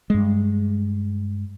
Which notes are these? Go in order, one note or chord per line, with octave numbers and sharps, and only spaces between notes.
G2 G#3